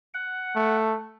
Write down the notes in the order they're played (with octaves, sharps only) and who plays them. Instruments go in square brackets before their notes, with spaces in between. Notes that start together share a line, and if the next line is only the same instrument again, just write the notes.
[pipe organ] F#5
[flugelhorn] A3